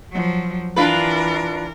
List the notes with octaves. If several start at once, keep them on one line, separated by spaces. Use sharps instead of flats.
F3 F#3
E3 D4 F4 A#4 B4